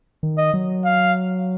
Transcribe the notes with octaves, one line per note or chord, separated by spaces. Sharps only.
D#3
D#5
F#3
F5